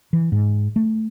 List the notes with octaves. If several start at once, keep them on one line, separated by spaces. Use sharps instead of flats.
E3
G#2
A3